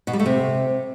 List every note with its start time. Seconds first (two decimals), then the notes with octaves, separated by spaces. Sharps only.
0.07 B2
0.13 G3
0.19 A3
0.26 C3